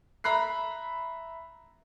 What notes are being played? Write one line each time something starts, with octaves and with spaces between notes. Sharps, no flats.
E5 A#5 B5 F#6 C7